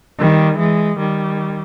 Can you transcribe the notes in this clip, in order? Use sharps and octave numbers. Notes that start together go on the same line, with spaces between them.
D#3 G3
E3 G#3
D#3 G3